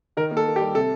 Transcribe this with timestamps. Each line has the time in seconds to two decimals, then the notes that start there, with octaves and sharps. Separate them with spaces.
0.17 D#3 A#4
0.31 A#3
0.37 A4
0.46 A#3
0.56 G4
0.60 G3
0.75 C3 A4